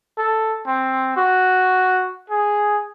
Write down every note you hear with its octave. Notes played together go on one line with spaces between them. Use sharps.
A4
C4
F#4
G#4